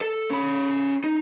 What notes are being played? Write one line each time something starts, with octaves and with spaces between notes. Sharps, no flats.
A4
C#4 B5
D#4